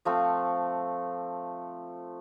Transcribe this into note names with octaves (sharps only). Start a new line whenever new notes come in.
F3 A3 C4